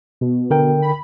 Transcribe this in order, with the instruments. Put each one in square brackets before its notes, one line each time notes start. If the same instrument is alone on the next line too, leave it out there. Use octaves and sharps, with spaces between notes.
[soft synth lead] B2
[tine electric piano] D3 A#4 G5
[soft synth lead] B5